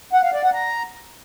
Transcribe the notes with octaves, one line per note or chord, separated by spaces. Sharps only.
F#5
F5
D5
F#5
A#5